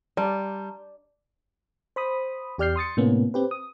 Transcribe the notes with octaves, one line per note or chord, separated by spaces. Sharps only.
G3 D5 A5 A#5 C6
C5 B5 D#6
E2 G4 D5 F6 G6 C7
C6 D#6 A6 C#7
A2 C3 A#3 B3 C#4
C4 G4 B4
D#6